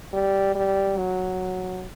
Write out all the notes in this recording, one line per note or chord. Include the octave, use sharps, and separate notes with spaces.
G3
G3
F#3